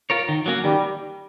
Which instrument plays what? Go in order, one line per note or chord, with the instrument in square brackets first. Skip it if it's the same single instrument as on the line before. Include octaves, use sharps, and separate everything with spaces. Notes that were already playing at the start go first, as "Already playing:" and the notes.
[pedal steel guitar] F4 A#4 C#5
D#3
F#3 A#3 C#4 F#4
[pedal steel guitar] D#3 [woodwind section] G3